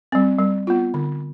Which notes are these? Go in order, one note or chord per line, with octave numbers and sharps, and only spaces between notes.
G3 C4
G3
B3 F4
D3